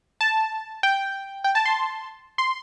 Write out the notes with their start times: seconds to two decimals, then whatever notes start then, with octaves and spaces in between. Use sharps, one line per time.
0.21 A5
0.83 G5
1.44 G5
1.55 A5
1.65 C6
2.38 C6